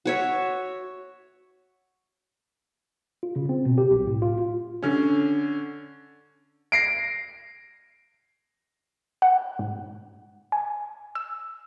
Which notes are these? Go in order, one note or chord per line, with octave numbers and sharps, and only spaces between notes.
F#4 C#5 E5
F4
C#3
C4
B2
G4
B1
A2
F4
D3 C#4
A#6 C7 D7
F#5
G#2
G#5
E6